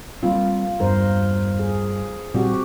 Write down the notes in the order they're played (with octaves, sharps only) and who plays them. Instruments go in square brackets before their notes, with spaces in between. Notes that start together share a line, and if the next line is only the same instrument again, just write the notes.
[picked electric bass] G3 G#3 C4 [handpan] A#3 F4
[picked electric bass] E2 [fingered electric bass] G2 [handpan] A#4 C5
[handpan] G#4
[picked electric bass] A#2 G3 [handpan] C4 F#4 G4